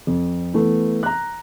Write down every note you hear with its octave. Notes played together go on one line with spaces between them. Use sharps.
F2
E3 A3 B3
A#5 F#6